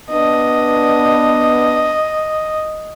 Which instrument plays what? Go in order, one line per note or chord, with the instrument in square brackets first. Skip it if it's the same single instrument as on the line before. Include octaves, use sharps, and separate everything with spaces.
[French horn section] B3 D4 [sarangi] D#5